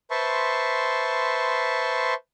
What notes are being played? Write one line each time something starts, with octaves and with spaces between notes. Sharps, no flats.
B4 C5 E5 A5 C6 C#6